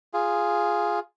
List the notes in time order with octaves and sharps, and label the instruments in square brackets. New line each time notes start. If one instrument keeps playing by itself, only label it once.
[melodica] F4 G#4